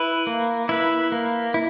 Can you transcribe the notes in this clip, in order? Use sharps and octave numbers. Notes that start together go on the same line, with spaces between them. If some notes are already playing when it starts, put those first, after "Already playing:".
Already playing: E4 B4
A#3
E4 B4
A#3
E4